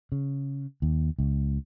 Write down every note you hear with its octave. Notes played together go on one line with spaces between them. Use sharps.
C#3
D#2
C#2